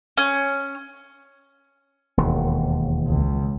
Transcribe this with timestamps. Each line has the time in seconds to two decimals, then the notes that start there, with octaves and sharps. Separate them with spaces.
0.17 C#4
2.17 E1 D#2
3.07 C#2